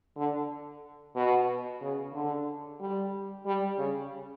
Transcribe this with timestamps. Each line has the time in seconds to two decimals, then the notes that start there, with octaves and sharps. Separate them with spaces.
0.17 D3
1.16 B2
1.81 C#3
2.13 D3
2.80 G3
3.46 G3
3.78 C#3